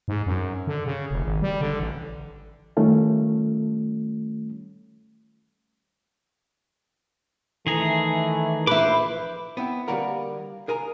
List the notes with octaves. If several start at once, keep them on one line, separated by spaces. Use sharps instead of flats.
G#2
F#2
D3
C#3
F1
G#1
G3
D3
A1
D#3 G3 A3 C#4 F4
D#3 E3 A3 G#4 A#5
A#1 E4 B4 C5 D6
B3 C4 E4
D3 G3 A#3 F#4 A#4
G#4 A#4 G#5 A#5